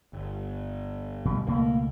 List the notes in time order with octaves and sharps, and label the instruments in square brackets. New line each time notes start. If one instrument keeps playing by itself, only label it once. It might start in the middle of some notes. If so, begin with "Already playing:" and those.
[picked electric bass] G1
[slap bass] B2 G3
[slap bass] C#2 B2 A3 [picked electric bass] A#3